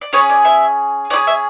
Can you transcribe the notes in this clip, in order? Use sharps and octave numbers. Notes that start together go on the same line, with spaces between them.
D5
C#4 G#4 C#5
D5
E5
C#4 E4 G#4 D5
E5